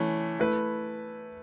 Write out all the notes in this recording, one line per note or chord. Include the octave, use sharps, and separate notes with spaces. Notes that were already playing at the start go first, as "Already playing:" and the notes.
Already playing: E3 A3 C#4
A3 E4 B4